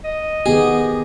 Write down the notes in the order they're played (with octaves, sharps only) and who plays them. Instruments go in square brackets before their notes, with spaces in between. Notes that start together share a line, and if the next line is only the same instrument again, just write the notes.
[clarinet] D#5
[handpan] D#3 B3 G4 [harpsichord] G#4